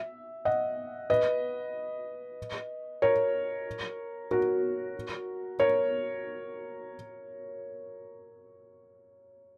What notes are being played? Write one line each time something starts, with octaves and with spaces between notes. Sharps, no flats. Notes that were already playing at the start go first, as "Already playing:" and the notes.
Already playing: E5
D#5 F#5
B4 D#5
A#4 C#5
F#4 A#4
A#4 C#5